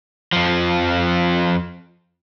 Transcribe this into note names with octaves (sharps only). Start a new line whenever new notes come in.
F2 F3